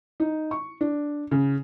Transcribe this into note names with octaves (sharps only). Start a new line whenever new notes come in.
D#4
C#6
D4
C#3